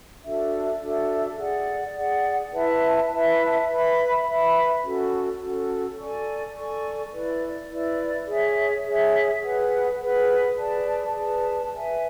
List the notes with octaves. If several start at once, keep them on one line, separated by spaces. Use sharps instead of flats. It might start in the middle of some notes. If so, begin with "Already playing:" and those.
D4 F#4 A4 E5
D4 F#4 A4 E5
G#4 D5 F#5
G#4 D5 F#5
E4 B4 E5 A5
E4 B4 E5 A5
B4 E5 B5
B4 E5 B5
C#4 F#4 A4
C#4 F#4 A4
A4 D5 G#5 C#6
A4 D5 G#5 C#6
E4 B4 D5
E4 B4 D5
G#4 C#5 E5
G#4 C#5 E5
G#4 B4 F#5
G#4 B4 F#5
G#4 B4 D5 A5
G#4 B4 D5 A5
B4 E5 G#5